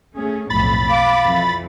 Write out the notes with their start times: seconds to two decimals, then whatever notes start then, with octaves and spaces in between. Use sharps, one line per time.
0.17 A3 C#4 G#4
0.50 B1 F2 A2 B5 A6
0.90 F5 D6
1.25 F2 E3